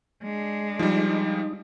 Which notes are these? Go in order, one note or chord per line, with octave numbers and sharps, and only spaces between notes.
G#3 D4
F3 G3 D#4